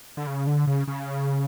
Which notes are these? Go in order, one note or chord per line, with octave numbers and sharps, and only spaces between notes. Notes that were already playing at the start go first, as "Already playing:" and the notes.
D3
C#3
D3
C#3
C#3